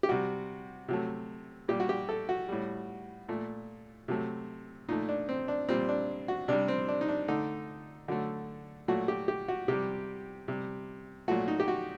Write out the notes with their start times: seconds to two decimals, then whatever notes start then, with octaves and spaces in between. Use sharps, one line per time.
0.03 G4
0.09 C3 G3 F#4
0.89 C3 F#3 A3
1.69 A#2 G3 G4
1.80 F#4
1.89 G4
2.09 A4
2.29 F#4
2.49 A2 G3
3.29 A#2 A3
4.08 C3 F#3 A3
4.89 A#2 A3 D#4
5.09 D4
5.29 C4
5.48 D4
5.69 A#2 G3 C4
5.89 D4
6.28 F#4
6.48 C3 G3 D4
6.68 C4
6.88 D4
7.01 D#4
7.08 D4
7.28 D3 A3 D#4
8.08 D3 F#3 A3
8.88 A#2 F#3 A3 F#4
9.08 G4
9.28 G4
9.48 F#4
9.68 C3 G3 G4
10.48 C3 G3
11.28 A#2 F#3 A3 F#4
11.48 D#4
11.60 G4
11.68 F#4